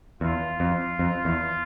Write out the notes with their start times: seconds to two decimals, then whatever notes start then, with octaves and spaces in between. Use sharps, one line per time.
0.21 E2 F4
0.60 F2
0.99 F2
1.25 E2